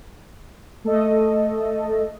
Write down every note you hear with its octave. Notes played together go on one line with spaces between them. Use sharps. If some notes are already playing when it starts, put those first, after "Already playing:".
A3 A4 D#5